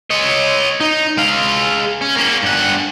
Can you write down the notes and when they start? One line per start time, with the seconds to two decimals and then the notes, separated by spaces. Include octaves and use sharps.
0.10 C#5 D#5
0.80 D#4
1.17 G#3 F5
2.01 C#4
2.16 A#3 C#4
2.43 G2 F#5